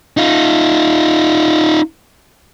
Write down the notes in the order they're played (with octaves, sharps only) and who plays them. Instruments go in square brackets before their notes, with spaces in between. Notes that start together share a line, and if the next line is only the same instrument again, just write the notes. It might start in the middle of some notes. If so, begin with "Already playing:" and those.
[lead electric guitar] D#4 F4